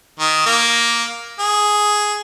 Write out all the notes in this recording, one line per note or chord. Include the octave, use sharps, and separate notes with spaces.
D#3
A#3
G#4